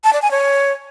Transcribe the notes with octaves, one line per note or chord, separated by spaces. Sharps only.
A5
D5
G#5
C#5